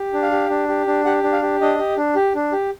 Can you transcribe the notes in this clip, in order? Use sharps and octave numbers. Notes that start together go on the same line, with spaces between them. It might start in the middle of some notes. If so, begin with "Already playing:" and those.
Already playing: G4
D4
F5
G4
D4
G4
D4
G4 F#5
D4
F5
G4
D4 D#5
G4
D4
G4
D4
G4